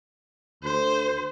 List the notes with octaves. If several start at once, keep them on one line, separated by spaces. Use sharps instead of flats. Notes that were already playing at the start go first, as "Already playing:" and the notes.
D2 C5